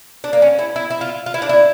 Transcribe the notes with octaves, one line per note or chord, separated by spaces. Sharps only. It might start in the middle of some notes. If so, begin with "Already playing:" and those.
D4
A#3
C#4
E4
E4
E4
F4
F4
E4
D4
E4